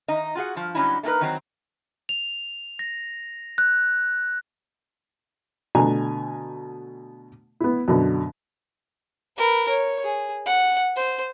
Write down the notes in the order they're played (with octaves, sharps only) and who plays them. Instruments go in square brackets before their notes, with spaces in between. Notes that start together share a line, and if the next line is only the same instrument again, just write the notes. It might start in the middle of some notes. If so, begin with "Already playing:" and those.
[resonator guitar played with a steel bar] D#3 D#4 D#5 A#5
F4 F#4 G#4 F#5
G2 F3
D3 F#3 G3 C#4 D#4 E4
A3 A#3 D#4 F#4 A#4 B4
D#3 E3 F#3 C4 A#5
[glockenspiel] F7
A#6
F#6
[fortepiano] B2 D3 A3 G#5 A#5
B3 E4
F#2 B2 D3
[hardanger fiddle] A#4 B4
C#5
G#4
F#5
C5